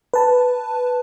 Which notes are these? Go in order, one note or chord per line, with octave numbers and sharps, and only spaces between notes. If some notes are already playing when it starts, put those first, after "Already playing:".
B4 A5